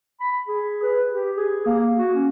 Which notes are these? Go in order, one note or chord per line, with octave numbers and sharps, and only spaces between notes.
B5
G#4
B4
G4
G#4
A#3
F#4
C#4